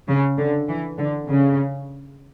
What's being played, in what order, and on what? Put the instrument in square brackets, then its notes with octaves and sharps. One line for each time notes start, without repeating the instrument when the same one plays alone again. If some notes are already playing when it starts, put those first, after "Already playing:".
[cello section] C#3
D3
E3
D3
C#3